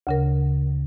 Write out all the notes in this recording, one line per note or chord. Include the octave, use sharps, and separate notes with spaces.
D2 C#3 A#4